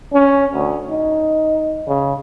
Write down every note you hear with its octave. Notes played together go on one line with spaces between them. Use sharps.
C#4
D2
D#4
C#3